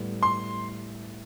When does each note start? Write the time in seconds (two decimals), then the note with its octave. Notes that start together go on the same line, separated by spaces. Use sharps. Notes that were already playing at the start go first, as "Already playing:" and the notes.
Already playing: A2 G3 B3 E4
0.23 C6